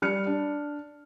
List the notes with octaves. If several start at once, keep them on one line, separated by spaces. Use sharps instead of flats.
G3 F6 C#7
D4